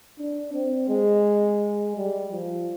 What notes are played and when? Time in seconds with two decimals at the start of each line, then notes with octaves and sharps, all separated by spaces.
0.19 D4
0.53 C4
0.89 G#3
1.96 G3
2.32 F3